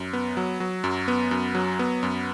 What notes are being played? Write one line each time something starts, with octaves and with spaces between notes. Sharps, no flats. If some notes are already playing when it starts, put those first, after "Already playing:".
Already playing: F#2
B3
F#3
F#3
F#2
B3
F#2
F#3
B3
F#2